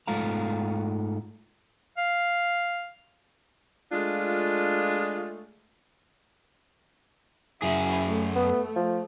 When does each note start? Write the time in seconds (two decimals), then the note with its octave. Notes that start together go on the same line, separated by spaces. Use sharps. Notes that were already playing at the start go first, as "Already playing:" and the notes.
0.08 G#2 A3 F4 A4 F5 A#5
1.97 F5
3.92 G#3 A3 D4 F4
7.62 F#2 E4 F#4 G#4
8.06 A3
8.36 B3
8.76 F3